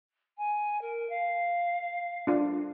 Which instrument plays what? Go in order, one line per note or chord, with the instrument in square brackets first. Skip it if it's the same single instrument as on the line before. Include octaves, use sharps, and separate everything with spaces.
[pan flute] G#5
A#4
F5
[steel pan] D4 F4